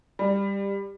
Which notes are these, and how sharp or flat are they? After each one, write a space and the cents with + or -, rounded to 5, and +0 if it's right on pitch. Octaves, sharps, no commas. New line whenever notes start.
G3 +20